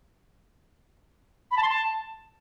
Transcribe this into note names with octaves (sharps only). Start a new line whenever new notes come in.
B5
A5
C6
A5